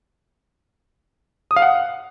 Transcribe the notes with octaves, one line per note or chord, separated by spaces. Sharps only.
D#6
F5
F#5